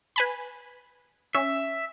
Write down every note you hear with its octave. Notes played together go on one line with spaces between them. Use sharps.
B4 G#5 B5
C#4 E5